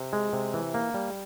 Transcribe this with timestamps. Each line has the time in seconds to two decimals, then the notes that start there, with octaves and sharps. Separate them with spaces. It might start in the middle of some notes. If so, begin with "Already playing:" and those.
Already playing: C3
0.13 G#3
0.33 C3
0.54 E3
0.74 A#3
0.94 G3